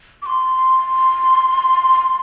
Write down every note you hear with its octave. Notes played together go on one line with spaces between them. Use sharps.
D6
C6